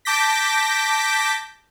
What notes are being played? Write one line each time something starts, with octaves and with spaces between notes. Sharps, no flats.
A5 D6 G6 A#6 B6